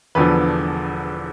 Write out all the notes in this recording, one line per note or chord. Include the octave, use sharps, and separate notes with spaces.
E1 E2 D3 F3 B4